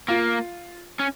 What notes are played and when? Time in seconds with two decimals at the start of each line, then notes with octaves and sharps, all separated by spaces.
0.08 A#3 F4
0.99 C#4